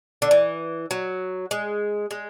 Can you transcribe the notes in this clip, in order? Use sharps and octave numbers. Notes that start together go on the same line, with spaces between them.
D3
E3
F#3
G#3
G#3